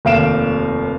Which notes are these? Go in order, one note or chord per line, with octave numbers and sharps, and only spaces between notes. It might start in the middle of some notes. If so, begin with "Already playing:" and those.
F1 D#2 F5 D7 E7